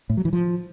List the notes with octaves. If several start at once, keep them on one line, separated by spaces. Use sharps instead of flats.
A2
F#3
E3
F3